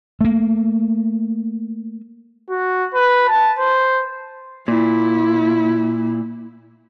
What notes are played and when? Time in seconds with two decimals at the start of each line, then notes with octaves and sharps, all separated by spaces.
0.21 A3 A#3
2.50 F#4
2.94 B4
3.29 A5
3.59 C5
4.68 A#2 E4